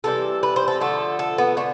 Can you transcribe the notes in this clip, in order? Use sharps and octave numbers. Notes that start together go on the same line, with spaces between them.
C3 E3 G3 A4
B4
C5
A4
D3 F3 A3 A4
A4
B3
D3 A3